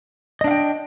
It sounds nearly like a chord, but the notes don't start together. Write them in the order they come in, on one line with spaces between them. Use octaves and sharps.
D#5 D4 F5 G5